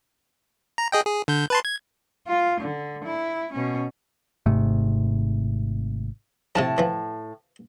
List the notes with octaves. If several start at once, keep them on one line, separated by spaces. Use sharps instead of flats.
A#5
G#4 D#5 G5
G#4
D3 G6
B4 A5 C6
G#6
F4
D3
E4
B2 C#4
G#1 G#2 C3 A3
A2 C3 F3 A5
E3 F3